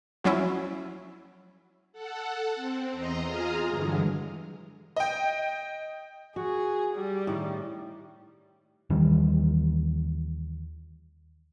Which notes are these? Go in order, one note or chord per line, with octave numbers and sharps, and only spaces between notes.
F3 F#3 C#4 E4
A4 F#5
C4
E2 D#5 A#5 C6
F4 G#4 A#5 D#6 F6
G2 D3 E3 F#3 G#3
D#5 G5
F#4 G#4
G3
A2 D#3
D#2 D#3 E3 G3